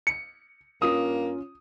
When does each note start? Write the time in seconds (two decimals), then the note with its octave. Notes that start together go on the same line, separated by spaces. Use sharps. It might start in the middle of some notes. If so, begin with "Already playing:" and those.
0.07 C#7
0.82 G2 A#3 C#4 F4 D#6